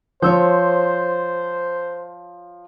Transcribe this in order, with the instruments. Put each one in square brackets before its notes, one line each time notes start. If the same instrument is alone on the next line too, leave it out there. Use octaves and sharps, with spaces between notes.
[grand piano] F3 [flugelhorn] C5 [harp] C#5 E6 G6